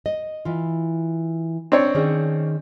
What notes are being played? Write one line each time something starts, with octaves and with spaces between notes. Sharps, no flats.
D#5
E3 F4
C4 D4 C#5
D#3 C#4 G#4